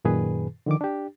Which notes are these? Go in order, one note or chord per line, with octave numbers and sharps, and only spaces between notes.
F#2 A#2 D#3 G#4 B4
D3 D#3 F3 D6
D4 G4